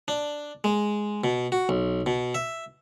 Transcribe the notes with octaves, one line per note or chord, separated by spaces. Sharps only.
D4
G#3
B2
F#4
B1
B2
E5